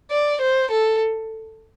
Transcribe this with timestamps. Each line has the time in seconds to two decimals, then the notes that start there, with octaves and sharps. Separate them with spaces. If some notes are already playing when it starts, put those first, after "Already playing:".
0.11 D5
0.41 C5
0.71 A4